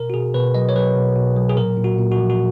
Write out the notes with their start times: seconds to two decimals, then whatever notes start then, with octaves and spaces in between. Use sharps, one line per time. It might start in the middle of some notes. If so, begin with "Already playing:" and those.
Already playing: B2 A#4
0.10 F#4
0.14 B2 G#4
0.34 B2 B4
0.54 F#3 D#5
0.69 C#5
0.76 F#3 B4
0.96 B2
1.16 B2
1.36 F#3
1.49 G#4
1.57 A#2 A#4
1.77 A#2
1.84 F#4
1.98 A#2
2.12 F#4
2.18 F3
2.30 F#4